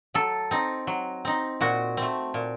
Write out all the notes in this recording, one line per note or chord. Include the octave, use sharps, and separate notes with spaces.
F#3 A4
C4 D#4
F#3
C4 D#4
A#2 F#4
A3 C4
A#2